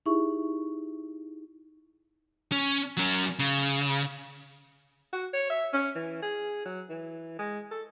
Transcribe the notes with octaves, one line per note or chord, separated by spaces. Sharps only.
D#4 E4 G4 G#4 E5 C#6
C#4
F#3 C#4
C#3
F#4
C#5
E5
C#4
E3
G#4
F#3
E3
G#3
A4